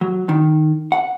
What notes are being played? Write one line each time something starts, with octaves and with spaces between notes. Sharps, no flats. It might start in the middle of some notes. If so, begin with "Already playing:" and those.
F#3
D#3
F#5